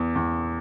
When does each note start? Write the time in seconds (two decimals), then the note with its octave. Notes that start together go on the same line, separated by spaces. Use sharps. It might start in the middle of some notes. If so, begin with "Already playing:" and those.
Already playing: E2
0.16 E2